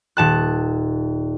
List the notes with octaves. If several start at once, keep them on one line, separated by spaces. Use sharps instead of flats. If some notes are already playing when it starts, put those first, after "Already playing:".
D#1 A5 F#6